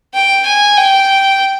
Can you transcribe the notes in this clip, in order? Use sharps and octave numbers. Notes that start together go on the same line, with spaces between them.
G5
G#5
G5